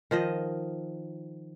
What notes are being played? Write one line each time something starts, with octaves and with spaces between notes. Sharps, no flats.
D#3 F3 D#5